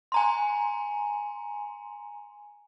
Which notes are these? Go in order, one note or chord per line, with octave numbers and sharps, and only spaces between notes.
G#5 A#5 C6